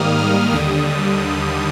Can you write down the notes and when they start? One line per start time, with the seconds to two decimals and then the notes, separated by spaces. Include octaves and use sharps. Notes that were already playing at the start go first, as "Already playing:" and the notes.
Already playing: G#2 D#3 G3 A#3 D#6 F6
0.19 F6
0.53 D#2 D3 G3 D#6